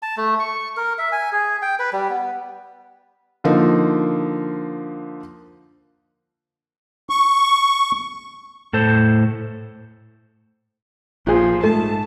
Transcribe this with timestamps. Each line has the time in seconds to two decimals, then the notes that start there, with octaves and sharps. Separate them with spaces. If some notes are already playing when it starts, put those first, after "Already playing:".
0.02 A5
0.17 A3
0.39 C#6
0.77 A#4
0.99 E5
1.12 G#5
1.32 G#4
1.62 G5
1.79 B4
1.93 G3
2.10 B3
3.44 D3 F3 A#3 D#4
7.10 C#6
8.73 A2 A4 C5
11.27 A#1 A#2 F3 G#4
11.63 G#2 A3 A5